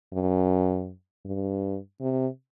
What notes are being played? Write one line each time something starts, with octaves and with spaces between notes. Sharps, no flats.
F#2
G2
C3